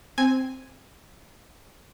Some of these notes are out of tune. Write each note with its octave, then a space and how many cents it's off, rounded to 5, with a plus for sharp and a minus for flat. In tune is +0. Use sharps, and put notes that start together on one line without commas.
C4 +0 G#5 +0